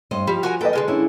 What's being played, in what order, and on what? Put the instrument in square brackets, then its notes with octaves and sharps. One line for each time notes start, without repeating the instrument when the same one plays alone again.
[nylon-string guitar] G2 C5 D#5
[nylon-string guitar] F3 [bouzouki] G3
[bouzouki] F#4 A#4 G#5
[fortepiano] A4 B4 D#5 [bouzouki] G5 [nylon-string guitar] A5
[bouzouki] D3 G#3 A#3
[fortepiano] C#4 [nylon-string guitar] D4 E4